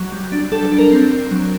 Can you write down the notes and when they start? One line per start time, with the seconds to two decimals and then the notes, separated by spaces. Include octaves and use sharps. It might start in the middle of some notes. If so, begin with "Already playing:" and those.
Already playing: F#3
0.12 G3
0.32 D4
0.52 G3 A4
0.65 A4
0.72 D4
0.78 A#4
0.91 C4
1.11 C4
1.31 F#3